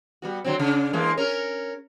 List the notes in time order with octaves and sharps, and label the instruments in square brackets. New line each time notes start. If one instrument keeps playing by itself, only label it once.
[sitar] G3 B3 F#4
D3 F#3 C4
C#3 D4
E3 G#3 A#3
C#4 A#4